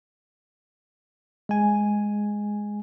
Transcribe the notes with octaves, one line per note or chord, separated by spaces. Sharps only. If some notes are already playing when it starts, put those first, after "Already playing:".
G#3 G#5